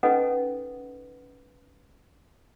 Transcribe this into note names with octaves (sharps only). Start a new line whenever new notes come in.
C#4 D#4 A4 B4 D#5 F#5